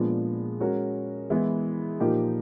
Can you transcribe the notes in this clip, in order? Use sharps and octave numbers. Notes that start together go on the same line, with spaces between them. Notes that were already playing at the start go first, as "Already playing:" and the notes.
Already playing: A#2 F3 G#3 B3 D4
G#3 C#4 F#4 A#4
E3 G#3 B3 E4
A#2 F3 A#3 D#4 G4